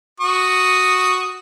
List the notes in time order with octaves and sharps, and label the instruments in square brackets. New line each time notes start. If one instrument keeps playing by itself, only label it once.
[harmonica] F#4 C#6 D#6